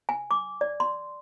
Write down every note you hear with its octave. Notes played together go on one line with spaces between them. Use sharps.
G#5
D6
D5
C6